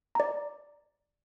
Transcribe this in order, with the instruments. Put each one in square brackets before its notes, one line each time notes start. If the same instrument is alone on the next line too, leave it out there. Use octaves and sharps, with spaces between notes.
[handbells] D5 A#5